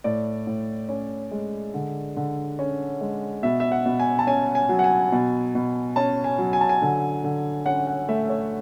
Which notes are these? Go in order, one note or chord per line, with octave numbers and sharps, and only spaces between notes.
A2 D5
A2
C#4
G#3
D3
D3
C#4
G#3
B2 E5
E5
F#5
B2
G#5
A5
C#4 G#5
G#5
F#3
F#5
G#5
B2
B2
C#4 A5
G#5
F#3
G#5
A5
G#5
D3
D3
C#4 F#5
F#5
A3 E5
C#5